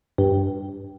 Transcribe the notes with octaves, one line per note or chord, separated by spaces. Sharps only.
G2